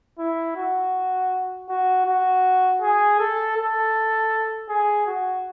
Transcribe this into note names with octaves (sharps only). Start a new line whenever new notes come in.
E4
F#4
F#4
F#4
G#4
A4
A4
G#4
F#4